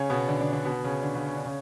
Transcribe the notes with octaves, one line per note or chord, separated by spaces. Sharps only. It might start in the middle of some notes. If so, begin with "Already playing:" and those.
Already playing: C#3 C#4
B2 B3
D3 D4
D3 D4
D3 D4
B2 B3
C#3 C#4
D3 D4
C#3 C#4
C#4
D4
C#3 C#4